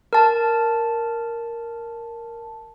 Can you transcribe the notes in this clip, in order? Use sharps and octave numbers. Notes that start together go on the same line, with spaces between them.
A#4 A5